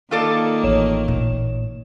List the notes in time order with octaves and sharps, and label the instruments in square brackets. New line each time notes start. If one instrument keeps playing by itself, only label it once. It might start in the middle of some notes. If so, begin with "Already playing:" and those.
[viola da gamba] D#3 A#3 [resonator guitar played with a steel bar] F4 A4 D5
[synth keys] A1 C#5 E7
[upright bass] A#2